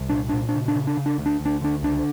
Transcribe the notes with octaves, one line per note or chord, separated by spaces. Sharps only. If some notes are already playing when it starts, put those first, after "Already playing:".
Already playing: C2
A#2 D4
A#2 D4
D4
C#3
D4
C#3
D4
C#3
D4
D2
D4
D2
D4
D3 D4
C#2 D4